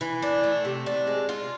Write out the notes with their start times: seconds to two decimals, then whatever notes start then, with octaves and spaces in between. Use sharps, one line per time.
0.01 E3
0.22 D4
0.43 A3
0.65 C3
0.86 D4
1.07 G#3
1.29 F4